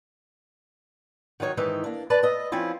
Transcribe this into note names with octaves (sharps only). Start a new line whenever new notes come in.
D#3 F#3 D#4 C#5
G#2 D#3 E3 D#4 E5
A#3 D4
B4 D5 A5
B4 D#5 E5
F3 C4 C#4 E4 F4